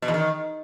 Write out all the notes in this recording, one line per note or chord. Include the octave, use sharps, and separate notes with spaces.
B2
E2
D#3